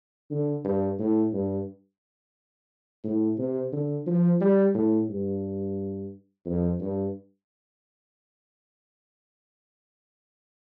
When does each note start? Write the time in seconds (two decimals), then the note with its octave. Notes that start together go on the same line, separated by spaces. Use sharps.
0.31 D3
0.65 G2
0.99 A2
1.33 G2
3.04 A2
3.38 C3
3.73 D3
4.07 F3
4.41 G3
4.75 A2
5.09 G2
6.46 F2
6.80 G2